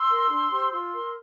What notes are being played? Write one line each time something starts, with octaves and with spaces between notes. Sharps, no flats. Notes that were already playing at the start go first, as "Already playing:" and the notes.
Already playing: C6 E6
A#4
D4
G4 C5
F4 C6 E6
A#4